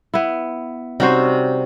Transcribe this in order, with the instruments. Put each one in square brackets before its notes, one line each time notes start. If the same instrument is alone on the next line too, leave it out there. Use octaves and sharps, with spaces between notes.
[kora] B3 E4
[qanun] C3 G3 C#4 [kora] D#4 F#4 C5